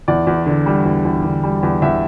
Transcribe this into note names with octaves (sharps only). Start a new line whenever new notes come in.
E2 D5
E2
D3
G3
E2
E2
D3
G3
E2
E2 E5